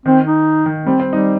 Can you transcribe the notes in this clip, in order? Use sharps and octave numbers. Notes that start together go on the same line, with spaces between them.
D#3 C4
D#4
D#3
G3 C4
C4
G3
D#4